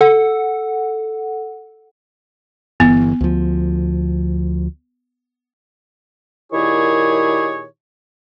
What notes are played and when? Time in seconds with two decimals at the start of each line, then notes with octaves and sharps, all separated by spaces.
0.01 A4 F#5
2.80 G1 E3 B3
3.21 D2 F3
6.53 A#2 D#3 E4 G4 G#4 C#5